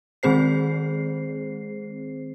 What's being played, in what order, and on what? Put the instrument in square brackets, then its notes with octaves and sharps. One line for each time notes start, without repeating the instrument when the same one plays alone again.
[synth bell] D#3 G#3 C4 G#4 C5 C7